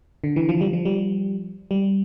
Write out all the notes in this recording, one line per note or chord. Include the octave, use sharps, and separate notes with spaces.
D3
E3
F3
G3
F3
G3
G3